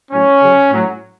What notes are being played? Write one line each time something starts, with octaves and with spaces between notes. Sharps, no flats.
A2 F#3 C#4
C#3 F#3
A2 F#3